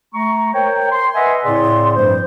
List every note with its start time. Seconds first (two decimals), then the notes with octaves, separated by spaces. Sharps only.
0.14 A3 A#5 C#6
0.53 A#4 C5 C#5 G5
0.91 C6
1.15 B4 D#5 E5 F#5 G#5 C6
1.43 A2 C#3 C4 G#4 D5 C6
1.96 G2 F3 G3 A3 C5